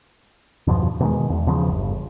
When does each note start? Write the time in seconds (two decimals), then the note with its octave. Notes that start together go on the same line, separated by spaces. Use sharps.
0.67 E2 G2 B2 F3
1.00 B2 D#3 G#3
1.30 E2
1.47 E2 C#3 F3
1.69 G1